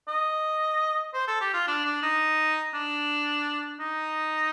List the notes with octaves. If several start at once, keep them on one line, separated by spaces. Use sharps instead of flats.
D#5
C5
A4
G4
F4
D4
D4
D#4
D4
D#4